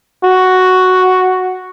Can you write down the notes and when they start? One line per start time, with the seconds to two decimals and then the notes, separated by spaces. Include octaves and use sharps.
0.24 F#4